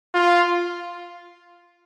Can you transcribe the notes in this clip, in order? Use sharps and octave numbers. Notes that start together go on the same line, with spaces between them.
F4